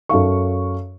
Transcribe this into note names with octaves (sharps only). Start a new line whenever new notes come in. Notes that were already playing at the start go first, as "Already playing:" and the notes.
F#2 A4 F5 C#6